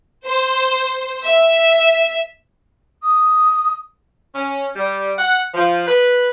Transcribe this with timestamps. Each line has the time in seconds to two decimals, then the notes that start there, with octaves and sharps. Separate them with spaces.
0.24 C5
1.24 E5
3.03 D#6
4.35 C#4
4.76 G3
5.18 F#5
5.54 F3
5.86 B4